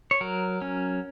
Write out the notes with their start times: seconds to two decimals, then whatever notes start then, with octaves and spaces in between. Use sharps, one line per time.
0.11 C#5
0.21 F#3 A#4
0.62 C#4